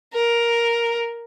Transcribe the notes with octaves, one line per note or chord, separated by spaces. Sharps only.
A#4